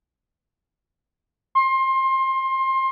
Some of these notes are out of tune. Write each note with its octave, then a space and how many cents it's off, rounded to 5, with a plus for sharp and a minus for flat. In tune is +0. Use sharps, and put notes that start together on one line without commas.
C6 +25